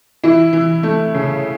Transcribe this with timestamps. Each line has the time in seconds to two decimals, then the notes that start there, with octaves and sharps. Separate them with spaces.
0.23 E3 E4
0.53 E3
0.83 A3
1.14 C#3